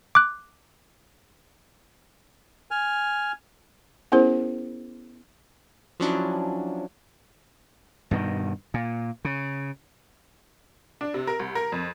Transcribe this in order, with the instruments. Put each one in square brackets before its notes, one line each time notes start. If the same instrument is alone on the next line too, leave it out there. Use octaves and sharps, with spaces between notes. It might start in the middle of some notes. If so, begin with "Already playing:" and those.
[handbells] D6 F#6
[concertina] G#5 F6
[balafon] B3 C#4 E4 G#4 A#4 C5
[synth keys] F3 F#3 C#4 D4 E4
[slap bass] G2 B2 D3 D#3
A#2
C#3
[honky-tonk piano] D4
C3
A#4
C2
A#4
F2